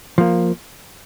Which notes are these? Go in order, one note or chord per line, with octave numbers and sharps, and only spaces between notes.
F3 A#3